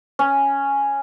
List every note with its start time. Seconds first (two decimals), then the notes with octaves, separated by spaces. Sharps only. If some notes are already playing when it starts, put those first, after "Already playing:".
0.19 C#4